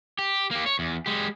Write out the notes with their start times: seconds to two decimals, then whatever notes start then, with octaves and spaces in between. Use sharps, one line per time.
0.19 G4
0.51 A#3 G4
0.66 C#5
0.79 E2
1.06 G#3 G4